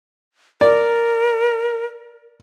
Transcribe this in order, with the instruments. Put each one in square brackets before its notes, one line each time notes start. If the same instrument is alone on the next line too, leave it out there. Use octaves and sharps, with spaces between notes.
[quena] A#4 [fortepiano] D5